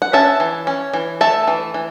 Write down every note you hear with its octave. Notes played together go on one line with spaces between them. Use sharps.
F#5
C#4 E5 A5
E3
C#4
E3
A3 E5 A5
E3
E3